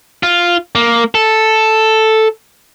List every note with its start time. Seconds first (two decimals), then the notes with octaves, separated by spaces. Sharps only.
0.23 F4
0.75 A#3
1.15 A4